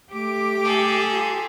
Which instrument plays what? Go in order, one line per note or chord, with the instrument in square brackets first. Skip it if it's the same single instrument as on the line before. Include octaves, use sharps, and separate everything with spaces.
[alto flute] A3 [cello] G4 [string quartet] D6
[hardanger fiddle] G#4 A4
[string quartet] F4